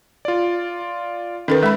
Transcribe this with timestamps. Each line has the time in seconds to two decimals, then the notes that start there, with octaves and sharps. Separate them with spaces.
0.25 F4 D5
1.48 D#3 C#4 A4 B4
1.63 G#3 E5 B5